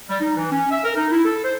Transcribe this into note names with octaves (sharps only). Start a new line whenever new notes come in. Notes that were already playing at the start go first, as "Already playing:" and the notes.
G3
D#4
E3
C#4
E5
A#4
D#4
E4
A4
C5